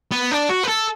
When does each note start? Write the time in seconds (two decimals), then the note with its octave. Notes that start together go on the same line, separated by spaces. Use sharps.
0.11 B3
0.31 D4
0.49 F#4
0.64 B4
0.68 A4